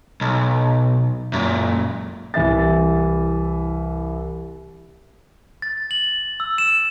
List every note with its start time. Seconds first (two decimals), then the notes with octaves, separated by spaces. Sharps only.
0.21 B1
1.33 F#2 A#2
2.34 C2 E3 E5 A6
5.62 A6
5.91 F#7
6.40 E6
6.58 E7